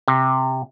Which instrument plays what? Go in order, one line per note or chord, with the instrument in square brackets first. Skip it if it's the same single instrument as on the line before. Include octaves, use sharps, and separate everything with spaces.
[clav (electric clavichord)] C3